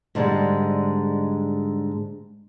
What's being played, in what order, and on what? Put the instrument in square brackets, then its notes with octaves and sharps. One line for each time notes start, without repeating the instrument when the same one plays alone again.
[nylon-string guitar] G#2 D3 G3 G#3